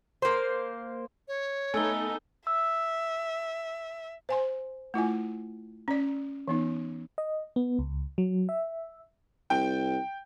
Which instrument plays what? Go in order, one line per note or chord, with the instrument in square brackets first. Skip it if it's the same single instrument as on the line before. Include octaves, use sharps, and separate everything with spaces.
[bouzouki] A#3 C5
[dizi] C#5
[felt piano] A3 [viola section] B3 D#4 A4 [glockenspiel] G#5 E6 G7
[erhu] E5 [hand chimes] E6
[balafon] C5 G#5 C6
A3 E4 F4 G#5
C#4 D5
E3 B3 D#4
[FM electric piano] D#5
B3
C#2
F#3
E5
[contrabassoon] C2 [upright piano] G5